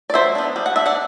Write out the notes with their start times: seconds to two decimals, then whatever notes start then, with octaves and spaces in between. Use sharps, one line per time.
0.10 D5
0.14 F#3 C5 E5
0.35 B3 D4
0.56 G3
0.66 F#5
0.76 D4 E5
0.86 D5 F#5